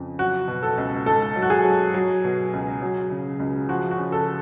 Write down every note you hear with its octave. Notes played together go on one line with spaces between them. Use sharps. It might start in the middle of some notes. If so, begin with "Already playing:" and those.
Already playing: F2 C#3
F#3 F#4
B2
A4
C#2
G#2 A4
F#3
F#4
G#4
F#3
F#3
B2
C#2
F#3
C#3
C#2
F3 F#4
F#4
C#3
A4